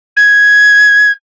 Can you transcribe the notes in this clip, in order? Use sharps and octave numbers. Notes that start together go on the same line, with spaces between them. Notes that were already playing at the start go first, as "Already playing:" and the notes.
G#6